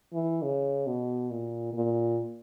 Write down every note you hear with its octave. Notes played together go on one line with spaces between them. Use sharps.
E3
C#3
B2
A#2
A#2